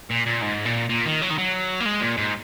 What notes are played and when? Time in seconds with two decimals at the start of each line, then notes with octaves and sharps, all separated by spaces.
0.10 A#2
0.26 A#2
0.42 G#2
0.66 A#2
0.89 A#2
1.05 D#3
1.21 F#3
1.30 D#3
1.38 F#3
1.80 A#3
1.86 G#3
2.01 A#2
2.17 G#2